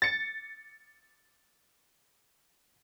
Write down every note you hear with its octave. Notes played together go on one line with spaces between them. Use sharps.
A6 C#7